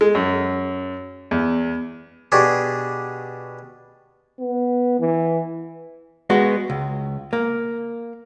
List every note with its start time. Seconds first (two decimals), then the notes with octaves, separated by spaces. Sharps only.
0.01 G#3
0.15 F#2
1.31 E2
2.32 B2 D4 G4 G#4 C#6
4.40 B3
4.99 E3
6.30 G#3 B3 F#4
6.70 C#2
7.33 A#3